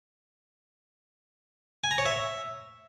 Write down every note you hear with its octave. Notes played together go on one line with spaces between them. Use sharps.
G#5
A#5
C#5
E5